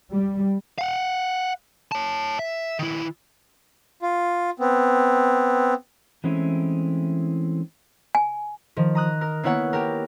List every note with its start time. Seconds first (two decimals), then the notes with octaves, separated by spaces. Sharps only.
0.14 G3
0.78 F5 F#5
1.92 C#5 A5
2.39 E5
2.79 D#3 E4
4.02 F4
4.60 B3 C4
6.24 E3 G#3 A3 C4 C#4 E4
8.15 G#5
8.76 D#3 F3
8.95 A#5 D#6 F#6
9.21 A#4
9.43 A#3 B3 E4 C#5 F#5
9.73 G4 A#4